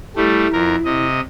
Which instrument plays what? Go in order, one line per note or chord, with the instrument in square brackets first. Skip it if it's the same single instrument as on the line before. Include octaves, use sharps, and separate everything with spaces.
[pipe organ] G3 A3 [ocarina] E4
[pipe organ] F2 A#4
C3 D#5